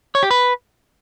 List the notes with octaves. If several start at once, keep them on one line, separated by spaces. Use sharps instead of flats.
C#5
G4
B4